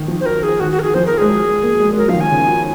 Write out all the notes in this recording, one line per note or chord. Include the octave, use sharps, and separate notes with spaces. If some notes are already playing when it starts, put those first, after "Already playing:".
Already playing: D#3
F3
C5
F#3 A#4
G#4
D#3 F#4
F#4
A#4
G#4
F3 C5
A#4
G#3 G#4
F#3
A#3
G#3
G#3
F#3 A#4
F3 F5
D#3
G#5
C#3